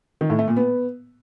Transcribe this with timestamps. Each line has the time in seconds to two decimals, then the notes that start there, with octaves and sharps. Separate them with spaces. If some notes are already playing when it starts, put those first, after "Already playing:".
0.21 D#3
0.30 A2
0.39 A3
0.48 A#2
0.57 B3